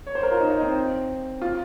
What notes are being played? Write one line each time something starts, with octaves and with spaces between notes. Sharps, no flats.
C#5
C5
A#4
F4
D#4
D#4
C4
F4